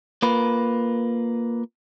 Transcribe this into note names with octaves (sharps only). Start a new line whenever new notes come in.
A#3 F4 A#4 B4